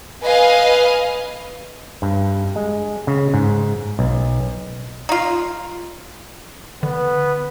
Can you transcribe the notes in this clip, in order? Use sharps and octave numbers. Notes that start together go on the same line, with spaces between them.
B4 D#5 F5 G#5
G2
G#3
C#3
G#2
B1
D#4 F4
D3 B3